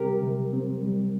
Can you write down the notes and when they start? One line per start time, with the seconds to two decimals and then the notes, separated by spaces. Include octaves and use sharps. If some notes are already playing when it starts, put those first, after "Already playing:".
Already playing: C3 G3 C4 G4 A#4
0.22 C3
0.53 C4
0.83 G3